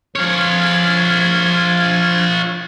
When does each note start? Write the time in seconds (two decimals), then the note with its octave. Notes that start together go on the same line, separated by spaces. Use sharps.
0.16 F3 F4 C#5 F6 G#6